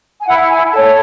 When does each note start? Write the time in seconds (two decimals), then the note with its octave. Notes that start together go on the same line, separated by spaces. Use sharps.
0.21 G#5
0.27 E4 F#5
0.50 G#5
0.71 A4 C#5 A5